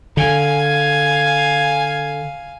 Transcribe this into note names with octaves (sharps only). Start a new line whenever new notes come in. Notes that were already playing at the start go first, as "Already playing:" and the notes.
D3 F5 G#5